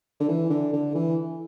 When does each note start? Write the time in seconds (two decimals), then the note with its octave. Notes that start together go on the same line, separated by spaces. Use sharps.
0.20 D3
0.29 E3
0.50 D3
0.73 D3
0.95 E3